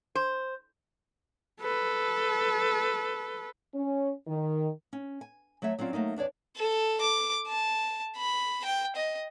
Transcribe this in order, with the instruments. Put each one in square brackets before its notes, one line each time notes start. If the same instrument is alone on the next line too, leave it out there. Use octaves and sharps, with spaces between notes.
[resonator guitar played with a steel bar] C5
[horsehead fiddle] A4 B4
[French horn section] C#4
D#3
[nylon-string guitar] C#4
G#5
F#3 A3 C#5 E5
F#3 C4 C#4 F4 D5
F#3 A3 A#3 D#4
E2 D4 C#5 D5
[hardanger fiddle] A4
D6
A5
B5
G5
D#5